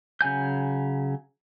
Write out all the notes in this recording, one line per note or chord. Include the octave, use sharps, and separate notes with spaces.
C#3 F#3 G#5 G6